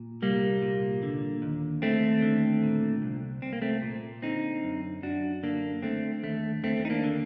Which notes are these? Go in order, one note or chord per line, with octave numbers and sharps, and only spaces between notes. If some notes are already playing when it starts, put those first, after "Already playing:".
Already playing: A#2
C2 G3 A#3
A#2
D3
D#2
D#2 A3 C4
D3
A#2
C2
C2 C4
A#3
A3 C4
A#2
D3 C4 D#4
F#2
F#2 D4 F#4
D3 A#3 D4
D3 A3 C4
D#2 A3
D#2 A3 C4
D#4
A#3 D4
D3